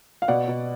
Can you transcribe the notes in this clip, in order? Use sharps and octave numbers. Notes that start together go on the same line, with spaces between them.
F5
B2 D5 F#5
B2